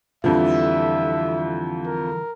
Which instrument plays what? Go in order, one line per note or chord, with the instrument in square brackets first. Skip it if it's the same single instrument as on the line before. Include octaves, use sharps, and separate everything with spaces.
[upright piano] F2 F3 [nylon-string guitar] D3 E3 G3 [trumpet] E5
[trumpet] A#4